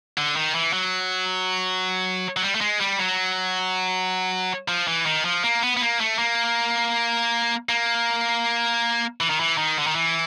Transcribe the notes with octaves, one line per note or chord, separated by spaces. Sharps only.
D3
D#3
E3
F#3
F#3
G3
A3
G#3
G3
F#3
F3
E3
D#3
F3
A#3
B3
B3
A#3
A3
A#3
A#3
E3
D#3
E3
D#3
D3
D#3
E3